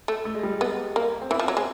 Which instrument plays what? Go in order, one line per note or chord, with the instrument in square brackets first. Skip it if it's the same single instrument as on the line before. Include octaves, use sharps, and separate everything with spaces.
[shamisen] A3
[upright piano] A3
G#3
G3
G#3
[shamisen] B3
A#3
[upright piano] C4
[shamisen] E3 [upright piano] B3
[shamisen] F3
F#3
G#3